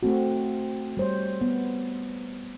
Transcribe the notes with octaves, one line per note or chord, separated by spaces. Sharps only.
A3 C4 F#4
G3 C5 C#5
B3